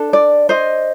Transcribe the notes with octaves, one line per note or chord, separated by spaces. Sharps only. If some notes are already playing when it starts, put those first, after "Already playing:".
Already playing: D4 A4
D5
C5 D#5